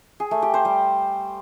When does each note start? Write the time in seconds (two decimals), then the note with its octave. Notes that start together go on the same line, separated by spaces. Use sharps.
0.20 G#4
0.31 A3
0.42 G4
0.54 C5
0.65 G3